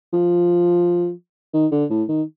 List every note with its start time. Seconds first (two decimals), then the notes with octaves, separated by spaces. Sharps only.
0.13 F3
1.54 D#3
1.72 D3
1.90 A2
2.09 D#3